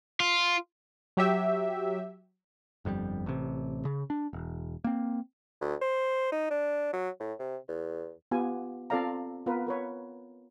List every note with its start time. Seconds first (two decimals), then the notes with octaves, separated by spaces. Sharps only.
0.20 F4
1.17 F#3 G4 E5
2.85 G1 F2 D3 G3
3.26 A1 C3
3.85 C#3
4.10 D4
4.33 E1
4.84 A#3 C4
5.61 D2
5.81 C5
6.32 D#4
6.51 D4
6.93 F#3
7.20 A2
7.39 C3
7.68 E2
8.31 B3 F4 G4 G#5
8.90 C4 F4 A4 D5 F5 A#5
9.46 B3 F4 A#4 B4
9.67 A#4 B4 C#5